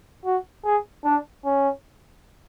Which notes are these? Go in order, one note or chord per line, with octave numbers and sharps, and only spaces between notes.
F#4
G#4
D4
C#4